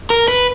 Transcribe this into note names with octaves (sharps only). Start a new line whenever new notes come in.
A#4
B4